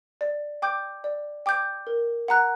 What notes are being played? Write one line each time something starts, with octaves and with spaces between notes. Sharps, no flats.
D5
G5 D6 G6
D5
G5 D6 G6
A#4
F#5 A#5 F#6